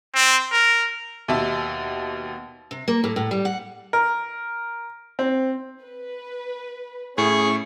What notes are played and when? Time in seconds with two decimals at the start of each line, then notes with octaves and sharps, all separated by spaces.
0.15 C4
0.52 A#4
1.28 D#2 B2 E5 A5
2.71 C3
2.88 A#3
3.04 A2
3.16 A2
3.31 G3
3.45 F#5
3.93 A#4
5.19 C4
5.83 B4
7.18 A2 C#4 E4 G#4 C#6